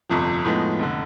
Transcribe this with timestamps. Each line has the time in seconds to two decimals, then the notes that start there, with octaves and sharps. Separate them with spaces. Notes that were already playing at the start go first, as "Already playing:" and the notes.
0.09 G1 F2 C3 F3
0.45 A2 F3 G#3 B3 D#4
0.79 F1 D3